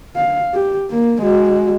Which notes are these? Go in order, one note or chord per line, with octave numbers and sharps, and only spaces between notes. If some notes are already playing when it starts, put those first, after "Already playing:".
F5
G4
A#3
G#3 F#4